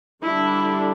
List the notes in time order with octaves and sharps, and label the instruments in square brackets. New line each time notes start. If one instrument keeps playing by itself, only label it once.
[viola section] D3 G3 D4 E4